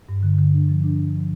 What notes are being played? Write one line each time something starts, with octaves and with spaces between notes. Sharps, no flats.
G2
D3
D3
D4
F3
D4
D4
F3